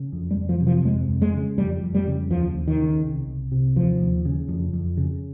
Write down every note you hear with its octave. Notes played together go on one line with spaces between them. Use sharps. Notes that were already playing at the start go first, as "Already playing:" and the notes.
Already playing: C#3
F2
G3
F2
F3
C3
F3
F2 G#3
F2
G#3
C#3
F2 G3
F2
G3
C#3
D#2 F3
D#2
D#3
C#3
C2
C2
C3
D#2 F3
D#2
C#3
F2
F2
C#3